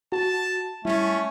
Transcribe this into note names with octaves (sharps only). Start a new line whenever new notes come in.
F#4 A5
G3 A3 C#4 E4